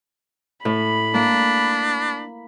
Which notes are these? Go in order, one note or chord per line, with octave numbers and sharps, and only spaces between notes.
A2 B5
A#3 D4